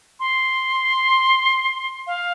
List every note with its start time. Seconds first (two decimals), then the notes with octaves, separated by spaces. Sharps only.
0.20 C6
2.07 F5